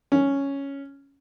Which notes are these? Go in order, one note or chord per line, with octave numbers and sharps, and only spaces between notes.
C#4